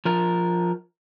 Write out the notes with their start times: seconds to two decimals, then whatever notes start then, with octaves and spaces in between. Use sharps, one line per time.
0.05 F3 A#4